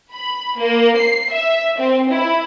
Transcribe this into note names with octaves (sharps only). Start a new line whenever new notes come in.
B5
A#3
C7
E5
C4
E4